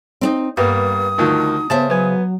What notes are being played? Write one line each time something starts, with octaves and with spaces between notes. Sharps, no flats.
C4 D4 D#4
G2 G3 A#3 B3 D#6
D2 D#3 F3 D#4
C#3 B3 C5 E5 A5
F#3 B3 G#5